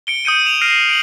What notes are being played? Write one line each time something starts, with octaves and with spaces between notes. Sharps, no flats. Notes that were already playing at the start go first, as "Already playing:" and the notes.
C#7 D7 G7
D#6 G6 C#7 D#7
E7 F7
F6 A#6 C7 D7 D#7
D7 F#7